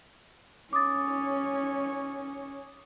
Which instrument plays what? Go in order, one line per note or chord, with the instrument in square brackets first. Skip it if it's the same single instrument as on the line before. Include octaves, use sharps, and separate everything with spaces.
[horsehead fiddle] C#4 C#5 [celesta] D6 D#6 A6